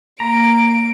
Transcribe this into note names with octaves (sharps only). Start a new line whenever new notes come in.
A#3 A#5 D7